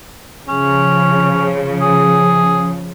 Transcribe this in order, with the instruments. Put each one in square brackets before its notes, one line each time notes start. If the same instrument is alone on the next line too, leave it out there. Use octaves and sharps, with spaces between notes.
[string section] C#3 F3 [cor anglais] C#4
[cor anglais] G#4